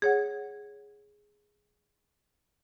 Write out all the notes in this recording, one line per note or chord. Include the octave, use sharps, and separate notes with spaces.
G#4 C#5 F#5